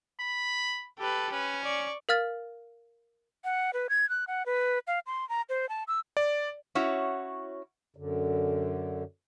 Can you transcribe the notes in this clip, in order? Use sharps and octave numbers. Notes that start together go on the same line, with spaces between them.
B5
G4 A4 B4
C#4 B4
D5 C#6
A#4 F5 F6 A6
F#5
B4
G#6
F#6
F#5
B4
F5
C6
A#5
C5
A5
E6
D5
C#4 E4 F#4 C#5
F#2 D3